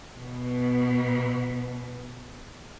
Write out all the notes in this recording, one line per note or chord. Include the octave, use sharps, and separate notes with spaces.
B2 B3